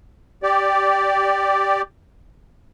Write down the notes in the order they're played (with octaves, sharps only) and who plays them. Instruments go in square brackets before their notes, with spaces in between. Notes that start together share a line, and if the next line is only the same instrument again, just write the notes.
[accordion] G4 D5